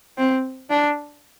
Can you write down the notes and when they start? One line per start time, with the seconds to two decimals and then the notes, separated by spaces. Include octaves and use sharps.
0.18 C4
0.70 D4